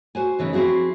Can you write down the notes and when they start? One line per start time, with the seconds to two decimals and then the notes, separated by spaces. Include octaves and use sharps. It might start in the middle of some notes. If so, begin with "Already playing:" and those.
0.15 F#4 C5 G#5
0.39 C#3 E3 B3 D#4
0.53 F3 C4 E4 F#4 G#4